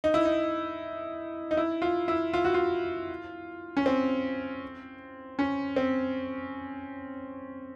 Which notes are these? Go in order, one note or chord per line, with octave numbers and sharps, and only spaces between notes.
D#4
E4
D#4
D#4
E4
F4
E4
F4
F#4
F4
C#4
C4
C#4
C4